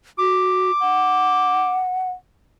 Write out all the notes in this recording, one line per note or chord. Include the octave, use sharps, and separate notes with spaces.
F#4 D6
F#5